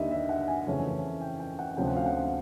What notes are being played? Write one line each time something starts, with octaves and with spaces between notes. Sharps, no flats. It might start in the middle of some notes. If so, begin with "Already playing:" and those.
Already playing: D#2 D3 G3 D#5 E5
E5
F#5
G#5
F2 C#3 E3 A3 C#4
G5
G5
F#5
D2 C3 F3 A3 C#4 G5
F#5
F5
F#5